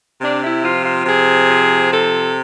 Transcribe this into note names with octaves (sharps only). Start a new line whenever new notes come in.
C3 D4
E4
F3 F4
F4
C3 G#4
F3
C3 A4